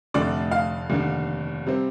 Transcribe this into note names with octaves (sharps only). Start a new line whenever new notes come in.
F1 F2 D3 A3 D5
F5
F1 D#2 D3
C3 G3 C4